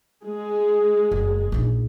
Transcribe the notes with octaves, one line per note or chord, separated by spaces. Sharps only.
G#3 G#4
F#1
A#1 D#4